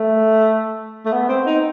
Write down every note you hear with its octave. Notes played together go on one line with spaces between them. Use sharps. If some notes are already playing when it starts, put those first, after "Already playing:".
Already playing: A3
A3
B3
C4
D#4